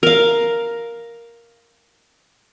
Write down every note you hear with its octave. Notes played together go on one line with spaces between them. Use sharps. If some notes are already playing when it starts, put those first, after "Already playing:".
A#4 F5